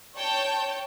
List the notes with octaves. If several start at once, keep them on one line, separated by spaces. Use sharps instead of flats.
C#5 G5 A5 G6